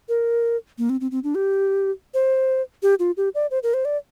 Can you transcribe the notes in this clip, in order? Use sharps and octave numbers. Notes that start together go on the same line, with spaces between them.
A#4
A#3
C4
C4
C4
D4
G4
C5
G4
F4
G4
D5
C5
A#4
C5
D5